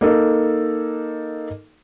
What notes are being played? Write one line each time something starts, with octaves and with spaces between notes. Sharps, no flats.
A#3 D#4 A4